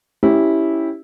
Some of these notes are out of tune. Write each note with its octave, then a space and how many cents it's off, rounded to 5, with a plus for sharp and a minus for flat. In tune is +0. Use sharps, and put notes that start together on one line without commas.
C#4 +0 E4 -10 G4 +0